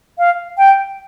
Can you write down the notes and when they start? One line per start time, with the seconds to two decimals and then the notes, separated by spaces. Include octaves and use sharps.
0.19 F5
0.58 G5